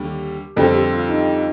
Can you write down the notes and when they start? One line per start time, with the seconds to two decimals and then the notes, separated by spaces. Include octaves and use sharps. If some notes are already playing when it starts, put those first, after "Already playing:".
Already playing: D#2 D3 G3 G4
0.56 F2 D3 G3 C4 A4
0.74 G4
0.92 F4
1.09 D#4